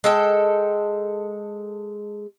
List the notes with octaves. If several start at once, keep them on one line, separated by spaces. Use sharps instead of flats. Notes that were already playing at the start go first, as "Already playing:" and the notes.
G#3 A4 G5